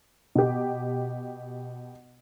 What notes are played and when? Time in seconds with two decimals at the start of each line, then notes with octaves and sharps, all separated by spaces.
0.35 B2 G4